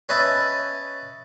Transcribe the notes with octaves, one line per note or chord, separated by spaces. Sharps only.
C#4 B4 D#5 E5 A5 B5